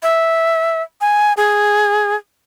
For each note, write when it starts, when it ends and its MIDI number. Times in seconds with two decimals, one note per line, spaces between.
0.03 0.82 76
1.01 1.33 80
1.37 2.15 68